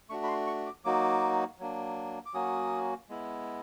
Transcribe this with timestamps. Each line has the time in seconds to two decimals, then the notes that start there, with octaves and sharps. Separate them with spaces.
0.09 A3 D4 F#4 C#6
0.24 B5
0.28 C6
0.47 C#6
0.66 D6
0.85 F#3 A#3 D#4 F#4 D6
1.59 F#3 A#3 D4
2.26 D6
2.34 F#3 A#3 C#4 F#4 D#6
3.09 G#3 B3 E4